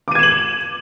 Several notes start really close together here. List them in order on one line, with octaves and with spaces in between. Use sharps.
D6 D#7 G#6 E7 F#7